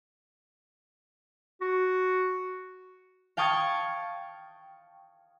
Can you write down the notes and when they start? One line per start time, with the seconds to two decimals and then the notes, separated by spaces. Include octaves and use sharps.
1.61 F#4
3.37 F5 G5 A5 C#6 D#6 G#6